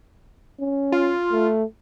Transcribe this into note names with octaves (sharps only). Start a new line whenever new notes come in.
C#4
F4
A3